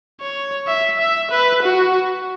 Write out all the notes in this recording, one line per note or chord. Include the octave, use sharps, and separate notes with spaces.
C#5
E5
E5
B4
F#4